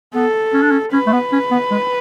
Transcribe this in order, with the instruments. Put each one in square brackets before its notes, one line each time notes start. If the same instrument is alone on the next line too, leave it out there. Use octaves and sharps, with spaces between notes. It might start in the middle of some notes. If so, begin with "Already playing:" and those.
[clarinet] B3 [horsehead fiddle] A4
[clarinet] C#4
D4
C#4
[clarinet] C#4 [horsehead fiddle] B4
[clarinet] A3
B3
C#4
B3
G#3